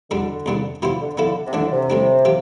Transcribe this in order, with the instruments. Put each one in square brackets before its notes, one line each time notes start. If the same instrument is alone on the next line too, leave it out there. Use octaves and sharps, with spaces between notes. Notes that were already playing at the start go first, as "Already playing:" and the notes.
[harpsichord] E2 B2 G3 D4 [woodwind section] D3
[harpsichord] E2 C3 G3 B3 D4
F3 B3 E4 G4 C5
[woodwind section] D3
[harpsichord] F3 B3 E4 A4
[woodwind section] C3
[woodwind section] D3 [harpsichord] E3 A3 D4
[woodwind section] C3
[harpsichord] A2 G3 D4
F3 C4 G4